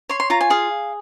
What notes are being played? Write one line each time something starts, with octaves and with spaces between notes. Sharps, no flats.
C#5 C6
C6
F4 A#5
G#5
G#4 F5